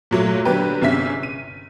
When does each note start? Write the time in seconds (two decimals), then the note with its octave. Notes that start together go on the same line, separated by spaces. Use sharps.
0.11 A#2 F#3 A3
0.45 D3 F#3 A#3 D4 G4 B4
0.82 G1 C3 C#4 G#4 E5 B6
1.23 D#7